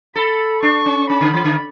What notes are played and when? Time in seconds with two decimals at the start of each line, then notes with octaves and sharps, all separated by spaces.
0.15 A4 B5
0.62 D4 C#6
0.86 C#4
1.09 C#4 B5
1.21 D3
1.33 E3
1.44 D3